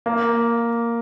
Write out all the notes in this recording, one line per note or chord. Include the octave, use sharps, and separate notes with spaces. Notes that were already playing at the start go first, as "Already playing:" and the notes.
A#3